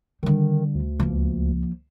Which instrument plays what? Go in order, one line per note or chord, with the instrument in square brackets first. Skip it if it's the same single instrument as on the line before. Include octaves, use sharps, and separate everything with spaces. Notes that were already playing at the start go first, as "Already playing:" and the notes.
[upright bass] D3 G3 [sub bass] D#3
[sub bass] D2
[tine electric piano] C#2 [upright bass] F3 A#3